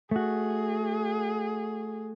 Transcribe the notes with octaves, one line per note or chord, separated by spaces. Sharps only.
A3 F#4 G#4